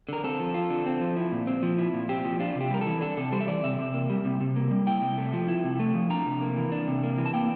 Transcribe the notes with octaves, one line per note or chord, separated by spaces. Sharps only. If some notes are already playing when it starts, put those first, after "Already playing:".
D3 A#4
C4 A4
F3
F4
D3
C4
F3
E4
A#2
C4
F3
E4
A#2
C4 G4
F3
D4 F4
C3
G4
G3 A#4
E3 A4
D4 A4
C3 A4
G3 C5
E5
E3 D5
C3 E5
C3
A#3
G3
C3
C3
A#3
G3
E4 G5
C3
A3
F3
E4
C3
A3
F3
D4 A#5
C3
A#3
E3
D4
C3
A#3
E3
A5
A#3 G5